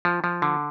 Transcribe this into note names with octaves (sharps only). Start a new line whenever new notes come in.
F3
F3
D3